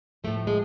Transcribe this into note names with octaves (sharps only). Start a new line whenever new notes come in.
A2 F3 A3
G#3